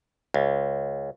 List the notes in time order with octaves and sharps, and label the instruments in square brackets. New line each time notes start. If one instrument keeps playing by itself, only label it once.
[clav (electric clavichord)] C#2